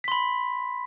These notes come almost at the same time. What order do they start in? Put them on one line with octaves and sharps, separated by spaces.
B6 C6 B5